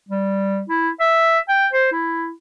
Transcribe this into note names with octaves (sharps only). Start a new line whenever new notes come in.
G3
E4
E5
G5
C5
E4